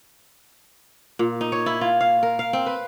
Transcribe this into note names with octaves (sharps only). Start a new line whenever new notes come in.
A#2
D#4
C#5
E4
F4
F5
A#4
F5
C4
B4